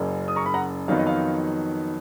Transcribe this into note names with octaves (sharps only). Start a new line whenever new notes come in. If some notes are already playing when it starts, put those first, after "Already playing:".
Already playing: F#1 F#2 C#3
D#6
A#5 C#6
B5
F#5 A#5
F2 D#3 F#3 B3 D#4 F5
D#5
F5